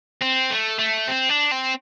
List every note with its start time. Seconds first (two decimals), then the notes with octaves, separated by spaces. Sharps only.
0.21 C4
0.50 A3
0.79 A3
1.08 C4
1.30 D4
1.52 C4